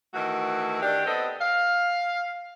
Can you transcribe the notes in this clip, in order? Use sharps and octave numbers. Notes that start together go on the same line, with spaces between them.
D#3 E3 A3 F#4
D#3 D4 G4
B3 C4 A4 D#5
F5